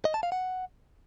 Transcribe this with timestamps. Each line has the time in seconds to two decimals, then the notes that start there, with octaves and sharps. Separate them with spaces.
0.05 D#5
0.14 A5
0.23 F5
0.32 F#5